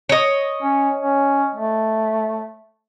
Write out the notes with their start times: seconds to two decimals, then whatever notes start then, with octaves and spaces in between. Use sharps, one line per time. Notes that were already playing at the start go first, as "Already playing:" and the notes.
0.09 C#5 D#5
0.62 C#4
1.00 C#4
1.55 A3